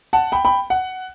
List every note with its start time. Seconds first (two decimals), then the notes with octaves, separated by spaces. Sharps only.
0.13 F#5 A5
0.32 G5 B5
0.45 G5 B5
0.70 F#5